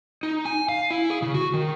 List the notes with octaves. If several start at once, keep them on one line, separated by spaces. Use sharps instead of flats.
D#4
G#5
F5
E4
G#4
C#3
F#4
D#3